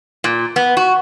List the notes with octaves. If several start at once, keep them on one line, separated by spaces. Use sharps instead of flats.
A#2
B3
F#4